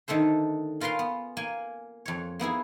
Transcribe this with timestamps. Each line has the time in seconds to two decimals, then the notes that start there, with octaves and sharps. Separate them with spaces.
0.08 D3 D#3 A3 A4 C5
0.80 C#4 F4 A#4 B4 F5 C6
0.99 B3
1.37 A#3 G#5
2.06 F2 C#5
2.39 A#3 B3 E4 G#4